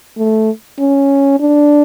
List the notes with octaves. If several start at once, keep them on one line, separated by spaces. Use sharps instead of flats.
A3
C#4
D4